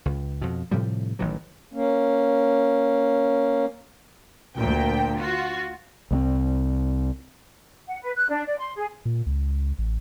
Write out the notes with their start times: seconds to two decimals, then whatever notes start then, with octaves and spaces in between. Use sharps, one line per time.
0.06 C#2
0.41 F2 B2
0.71 A2 C3 F3 G3
1.19 A1 D#3 E3 F#3
1.73 A#3 C#4
4.57 D2 A#2 G5
5.17 F4 F#4
6.11 C2 G#3 C4
7.88 F#5
8.02 B4
8.15 F#6
8.29 D4
8.46 D5
8.58 C6
8.76 G#4
9.05 A#2
9.26 C#2
9.78 A1